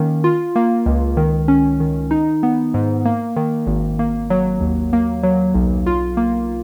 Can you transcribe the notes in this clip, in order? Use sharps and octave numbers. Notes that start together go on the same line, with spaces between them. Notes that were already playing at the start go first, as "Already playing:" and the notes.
Already playing: D#3 A#3 C#4
F4
A#3
C#2
D#3
C#4
D#3
D#4
B3
G#2
A#3
D#3
G#1
A#3
F#3
D#2
A#3
F#3
B1
F4
A#3